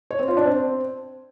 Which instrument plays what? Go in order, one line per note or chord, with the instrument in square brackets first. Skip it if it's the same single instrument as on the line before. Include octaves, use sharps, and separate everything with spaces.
[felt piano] C#5
C4
F4
D4
C4